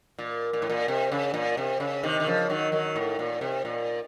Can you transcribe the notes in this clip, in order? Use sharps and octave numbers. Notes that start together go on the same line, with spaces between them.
A#2
A#2
A2
A#2
C3
C#3
A#2
C3
C#3
C3 D#3
D#3
C#3 F3
D#3 F#3
D#3 F#3
A2
A#2
C3
A#2